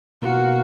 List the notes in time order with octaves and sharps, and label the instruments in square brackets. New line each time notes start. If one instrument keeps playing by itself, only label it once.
[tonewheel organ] B2 A#3 F4 [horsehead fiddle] F#4